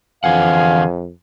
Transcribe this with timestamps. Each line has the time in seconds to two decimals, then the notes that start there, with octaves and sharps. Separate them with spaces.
0.24 F2 D3 E3 F5 F#5 G#5